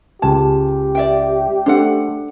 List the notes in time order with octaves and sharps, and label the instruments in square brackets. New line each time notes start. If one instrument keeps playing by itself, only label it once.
[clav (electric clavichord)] C#2 G#5 [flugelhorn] G4 [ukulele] A5
[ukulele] D5 E5 G5
[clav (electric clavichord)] A3 C5 [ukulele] D4 A4 F#5